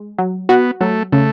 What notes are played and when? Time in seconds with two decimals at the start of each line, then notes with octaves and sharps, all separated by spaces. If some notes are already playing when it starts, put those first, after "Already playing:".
Already playing: G#3
0.18 F#3
0.49 B3 F#4
0.81 F#3 A3
1.12 C#3 A3